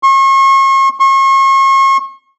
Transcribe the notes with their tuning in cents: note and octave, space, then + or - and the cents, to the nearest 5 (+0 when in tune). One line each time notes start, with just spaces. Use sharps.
C#6 -40
C#6 -40